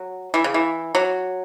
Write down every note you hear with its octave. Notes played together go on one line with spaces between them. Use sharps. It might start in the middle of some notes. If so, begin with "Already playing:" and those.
Already playing: F#3
E3
C#3
E3
F#3